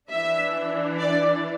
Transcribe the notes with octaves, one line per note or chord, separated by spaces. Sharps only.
E3 D4 E5
D5